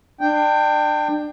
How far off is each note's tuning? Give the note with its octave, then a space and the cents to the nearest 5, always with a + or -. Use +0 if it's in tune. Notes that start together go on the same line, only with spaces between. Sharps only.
D4 +30 G5 +0